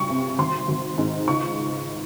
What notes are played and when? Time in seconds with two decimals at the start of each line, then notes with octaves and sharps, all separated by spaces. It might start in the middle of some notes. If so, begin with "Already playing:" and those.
Already playing: C#2 G2 G3 C#6
0.09 C3
0.38 G#1 C6
0.68 G#1
0.98 G#2
1.28 C#2 C#6